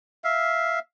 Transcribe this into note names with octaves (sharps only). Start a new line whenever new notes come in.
E5 F5